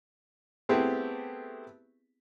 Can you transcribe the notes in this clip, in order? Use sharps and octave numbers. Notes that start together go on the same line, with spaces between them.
A3 B3 C4 E4 G4 G#4